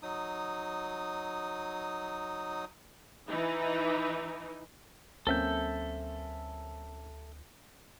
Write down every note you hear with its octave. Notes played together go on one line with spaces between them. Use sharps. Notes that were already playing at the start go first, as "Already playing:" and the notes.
F#3 D#4 D#6
E3 D#4
D2 F#3 A#3 C4 C#4 A4 E5 G6